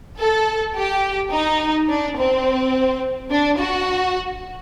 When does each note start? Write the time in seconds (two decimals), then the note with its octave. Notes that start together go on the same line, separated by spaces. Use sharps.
0.19 A4
0.75 G4
1.32 D#4
1.89 D4
2.17 C4
3.30 D4
3.59 F#4